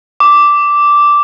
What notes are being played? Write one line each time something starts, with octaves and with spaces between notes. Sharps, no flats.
D6